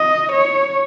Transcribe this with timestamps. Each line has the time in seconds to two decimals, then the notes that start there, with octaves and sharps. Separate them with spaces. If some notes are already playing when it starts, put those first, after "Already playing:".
Already playing: D#5
0.32 C#5